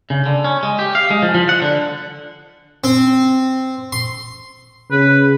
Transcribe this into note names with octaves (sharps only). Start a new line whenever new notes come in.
C#3
D3
C#4
G#3
G4
F5
G#3
F3
F3
F#5
D3
C4
C6
C#3 B4